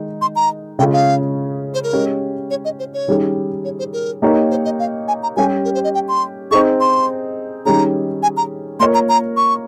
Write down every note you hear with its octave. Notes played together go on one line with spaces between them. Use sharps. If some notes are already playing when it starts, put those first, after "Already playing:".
Already playing: D#3 G#3 D#4
C6
A#5
C#3 G#3 C#4 F4 G#4 G5
F5
C5
A#4
G#3 C#4 G4
C#5
D#5
C5
C#5
D#3 G3 C#4 G#4
C#5
C5
A#4
A#3 D#4 G4 A#4 C#5
C5
D#5
F5
G#5
A#5
G3 C#4 G4 G#5
A#4
C5
D#5
G5
C6
C4 D#4 G#4 C#6
C6
D#3 G3 C#4 G#4 A#5
G#5
A#5
A#3 F4 A#4 C#5 C6
A#5
A#5
C#6